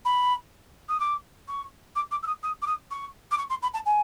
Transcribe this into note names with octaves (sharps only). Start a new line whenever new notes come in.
B5
D#6
D6
C#6
D6
D6
E6
D#6
D#6
D6
D#6
C#6
D6
C#6
C6
B5
A5
G#5